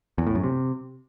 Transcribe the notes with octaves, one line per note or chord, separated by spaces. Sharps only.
E2
A2
F#2
C3